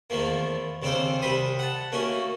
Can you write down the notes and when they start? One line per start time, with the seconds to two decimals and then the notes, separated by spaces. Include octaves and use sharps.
0.10 E2 D#3 F3 A3 A#3
0.82 D#2 C#3 C4 D4 A4 C5
1.22 C2 G3 C5 B5 C6 D#6
1.59 F#5 A5
1.92 A3 A#3 C#4 D#4 F#4